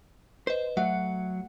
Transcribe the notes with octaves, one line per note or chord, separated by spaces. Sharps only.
B4 C5 D#5
F#3 A3 E5 F#5